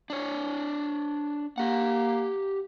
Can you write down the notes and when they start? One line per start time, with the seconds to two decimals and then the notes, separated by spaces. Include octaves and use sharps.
0.10 D4 C#5
1.58 A#3 G4 F#5